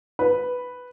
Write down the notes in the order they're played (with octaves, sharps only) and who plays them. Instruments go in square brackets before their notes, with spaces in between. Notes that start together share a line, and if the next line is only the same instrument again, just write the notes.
[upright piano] B4